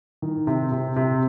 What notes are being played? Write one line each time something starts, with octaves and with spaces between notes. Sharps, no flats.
D#3
C3
C3
C3